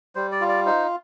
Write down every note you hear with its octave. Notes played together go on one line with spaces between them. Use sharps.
G3 C5
D5
F4
D5
D#4 C5